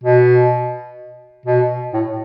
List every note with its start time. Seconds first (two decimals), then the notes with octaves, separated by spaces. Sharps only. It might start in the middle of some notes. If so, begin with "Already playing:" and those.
0.04 B2
1.46 B2
1.93 A2